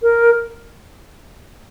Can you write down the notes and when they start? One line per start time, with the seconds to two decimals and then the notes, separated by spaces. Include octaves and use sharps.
0.03 A#4